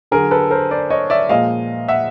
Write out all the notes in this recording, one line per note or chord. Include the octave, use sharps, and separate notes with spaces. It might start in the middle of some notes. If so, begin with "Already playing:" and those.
D3 F#3 G#4 A#4
A4 B4
A#4 C5
C5 D5
C#5 D#5
D5 E5
A#2 F3 G#3 D#5 F5
E5 F#5